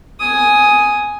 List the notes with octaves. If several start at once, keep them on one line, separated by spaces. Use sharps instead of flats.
G#5 D#6